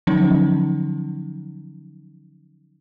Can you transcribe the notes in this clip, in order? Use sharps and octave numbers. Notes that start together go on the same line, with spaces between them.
D3 F3 F#3 C#4 D#4